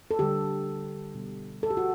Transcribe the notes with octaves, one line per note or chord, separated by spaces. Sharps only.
A4
D3 G3 G4
B2 G3
A4
G4
F#4